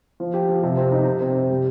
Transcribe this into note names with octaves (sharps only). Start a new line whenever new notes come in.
F3
G4
F3
C3
C4
D#4
C3
C4
C3
G3